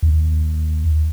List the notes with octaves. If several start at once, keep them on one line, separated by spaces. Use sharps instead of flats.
D#2